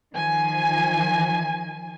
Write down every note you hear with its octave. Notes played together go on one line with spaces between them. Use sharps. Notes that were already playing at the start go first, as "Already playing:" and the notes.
D#3 F3 G#5